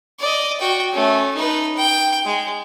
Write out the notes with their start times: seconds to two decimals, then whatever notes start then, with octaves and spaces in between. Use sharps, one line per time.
0.20 D5 D#5
0.60 F#4 G5
0.93 A3 C#4
1.35 D#4 B4
1.76 G5
2.25 G#3